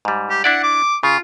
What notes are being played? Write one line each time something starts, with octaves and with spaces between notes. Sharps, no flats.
G#2 G3
G4
D4 E4 D5 F#5
D6
C#3 F4